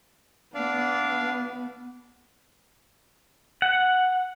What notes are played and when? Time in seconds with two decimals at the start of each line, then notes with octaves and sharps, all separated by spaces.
0.54 B3 D4 D5 F5
3.62 F#5